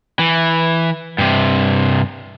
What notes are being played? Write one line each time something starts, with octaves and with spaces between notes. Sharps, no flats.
E3
G2 C3